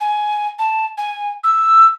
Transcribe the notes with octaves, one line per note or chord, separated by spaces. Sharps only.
G#5
A5
G#5
E6